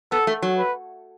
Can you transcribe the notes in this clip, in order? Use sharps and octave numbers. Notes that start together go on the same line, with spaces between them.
B3 A4
A3
F#3
B4